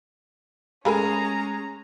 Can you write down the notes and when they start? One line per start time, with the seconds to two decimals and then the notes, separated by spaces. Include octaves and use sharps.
0.85 G#3 A3 C#4 G#4 A#4 A#5 B5